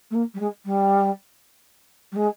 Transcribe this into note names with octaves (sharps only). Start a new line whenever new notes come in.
A3
A#3
G3
G#3
G3
G3
G#3